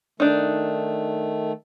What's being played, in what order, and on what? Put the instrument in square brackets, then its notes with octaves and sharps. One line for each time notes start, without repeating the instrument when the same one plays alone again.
[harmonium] D#3 A3 [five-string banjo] D4 D#4